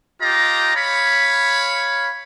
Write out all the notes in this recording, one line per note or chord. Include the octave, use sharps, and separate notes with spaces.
F4 G4 D#5 A#5
C#5 F5 B5